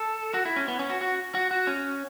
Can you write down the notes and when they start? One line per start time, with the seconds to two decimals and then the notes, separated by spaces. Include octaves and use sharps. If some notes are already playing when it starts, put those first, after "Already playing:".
Already playing: A4
0.34 F#4
0.45 E4
0.56 C#4
0.68 B3
0.79 C#4
0.90 F#4
1.01 F#4
1.35 F#4
1.51 F#4
1.67 C#4